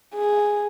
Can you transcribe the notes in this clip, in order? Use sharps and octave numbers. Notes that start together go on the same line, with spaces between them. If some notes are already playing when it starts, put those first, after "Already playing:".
G#4